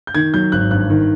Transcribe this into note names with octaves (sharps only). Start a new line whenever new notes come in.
G6
D#3 G#6
F#3 G6
G#1 F#6
G2 F#6
D#3